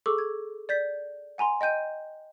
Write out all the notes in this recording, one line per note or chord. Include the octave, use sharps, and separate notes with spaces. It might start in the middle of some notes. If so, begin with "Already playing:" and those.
G#4 A4 C#6 D6 E6
G#6
D5 G6 B6
F#5 G#5 A#5 C6
D#5 G5 G6 D#7